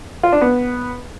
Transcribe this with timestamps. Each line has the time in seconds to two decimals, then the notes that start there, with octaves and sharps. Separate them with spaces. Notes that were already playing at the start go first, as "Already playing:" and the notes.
0.23 F4
0.32 D4
0.41 B3